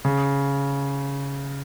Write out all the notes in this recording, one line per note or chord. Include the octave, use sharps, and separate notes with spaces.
C#3